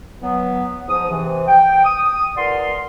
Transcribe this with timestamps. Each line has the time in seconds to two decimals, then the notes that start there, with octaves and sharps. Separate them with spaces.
0.21 E3 F#3 B3
0.88 G#2 F3 D#6
1.08 C3 E3
1.47 G5
1.84 D#6
2.36 E2 F#4 A#4 D5 C6